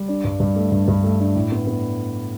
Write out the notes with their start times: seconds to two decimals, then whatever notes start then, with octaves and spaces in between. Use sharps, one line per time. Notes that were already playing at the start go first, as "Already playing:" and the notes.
Already playing: G3
0.08 D4
0.24 G2
0.40 G2
0.56 A3
0.71 G2
0.88 G2
1.04 A3
1.20 D4
1.35 A2
1.52 B3
1.67 B3